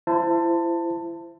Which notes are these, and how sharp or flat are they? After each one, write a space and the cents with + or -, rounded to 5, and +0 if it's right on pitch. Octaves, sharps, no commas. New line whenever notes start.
E4 +35 C5 -20 A5 +20